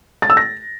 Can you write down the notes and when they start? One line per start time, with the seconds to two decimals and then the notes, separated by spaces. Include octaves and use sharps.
0.22 A6
0.30 E6
0.37 A#6